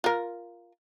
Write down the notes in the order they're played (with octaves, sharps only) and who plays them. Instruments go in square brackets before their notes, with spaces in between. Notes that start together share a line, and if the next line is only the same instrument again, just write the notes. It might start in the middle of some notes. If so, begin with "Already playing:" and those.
[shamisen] F4 A#4